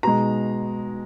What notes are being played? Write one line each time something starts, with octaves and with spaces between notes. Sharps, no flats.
B2 G#3 A#5